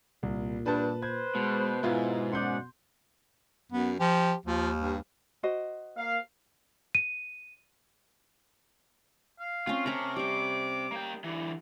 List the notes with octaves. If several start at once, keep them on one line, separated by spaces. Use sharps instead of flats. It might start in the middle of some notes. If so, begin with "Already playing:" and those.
C2 A#2
G2 D4 B4 A5
B4 C5 G#6
B2 G#3
G#2 B2 B3 E4 F4
F#2 D5 F#5 C6 G6
F#2 B3
F3 G4
D#2 F3
G2
F#4 C5 D#5
A#3 F5
D#7
F5
C4 C#4 F4
C3 C#4 A#4 A5 A#5
G3 C#5 D6
A#3 G5
D3 E3